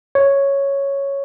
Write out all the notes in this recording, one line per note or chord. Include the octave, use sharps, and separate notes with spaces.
C#5